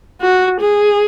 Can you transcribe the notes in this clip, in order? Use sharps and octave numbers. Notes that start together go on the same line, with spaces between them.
F#4
G#4